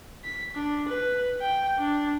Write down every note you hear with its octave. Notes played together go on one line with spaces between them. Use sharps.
B6
D4
B4
G5
D4